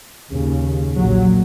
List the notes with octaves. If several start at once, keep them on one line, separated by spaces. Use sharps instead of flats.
D#2 C#3
A#1 A#2 F#3